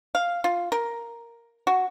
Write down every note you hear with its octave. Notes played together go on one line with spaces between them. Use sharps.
F5
F4
A#4
F#4